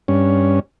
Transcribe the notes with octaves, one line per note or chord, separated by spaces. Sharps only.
G2 C#4